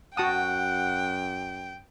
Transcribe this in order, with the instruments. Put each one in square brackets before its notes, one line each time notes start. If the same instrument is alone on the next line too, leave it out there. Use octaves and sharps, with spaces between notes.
[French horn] F#2 [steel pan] F#4 A5 D#6 [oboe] F#5 [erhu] G5